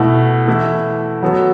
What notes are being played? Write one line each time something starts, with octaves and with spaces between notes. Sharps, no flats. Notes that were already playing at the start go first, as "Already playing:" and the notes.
Already playing: B2 A3 E4
E3 A3 E4
F#3 B3 F#4 A4